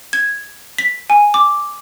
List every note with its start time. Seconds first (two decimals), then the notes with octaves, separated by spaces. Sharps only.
0.13 G#6
0.78 B6
1.10 G#5
1.34 D6